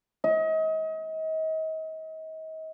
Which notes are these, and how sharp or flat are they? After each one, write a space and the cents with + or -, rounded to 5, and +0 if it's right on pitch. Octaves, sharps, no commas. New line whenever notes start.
D#5 +35